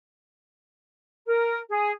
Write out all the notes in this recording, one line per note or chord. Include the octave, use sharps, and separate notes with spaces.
A#4
G#4